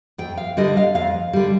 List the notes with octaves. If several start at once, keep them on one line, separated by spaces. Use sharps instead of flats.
F2 G5
F5
D3 G3 D#5
F5
F2 F5
D3 G3